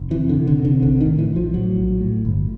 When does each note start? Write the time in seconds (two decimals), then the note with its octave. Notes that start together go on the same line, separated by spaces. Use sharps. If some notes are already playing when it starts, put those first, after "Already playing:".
Already playing: F1
0.11 C3 E3
0.29 D3
0.34 C3
0.47 D3
0.59 C3
0.65 D3
0.82 A#1 D3
1.01 D#3
1.06 A2
1.19 E3
1.30 A#1
1.36 F3
1.54 A2 F#3
1.77 A#1
2.01 A2
2.25 G1